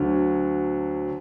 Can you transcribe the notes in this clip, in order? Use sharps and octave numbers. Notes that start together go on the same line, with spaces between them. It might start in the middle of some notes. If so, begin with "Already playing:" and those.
Already playing: D2 D3 F#3